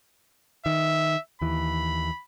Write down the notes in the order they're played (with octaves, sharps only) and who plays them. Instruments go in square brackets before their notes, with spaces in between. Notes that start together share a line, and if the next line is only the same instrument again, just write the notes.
[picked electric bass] D#3 [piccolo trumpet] E5
[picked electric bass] D#2 E3 [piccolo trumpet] B5